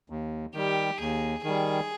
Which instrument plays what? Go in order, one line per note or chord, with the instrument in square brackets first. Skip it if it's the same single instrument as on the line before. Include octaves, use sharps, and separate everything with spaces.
[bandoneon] D#2
[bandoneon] D#3 G3 [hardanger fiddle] G4
[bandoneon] D#2 [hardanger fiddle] G#4
[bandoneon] D#3 G3 [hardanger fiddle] G#4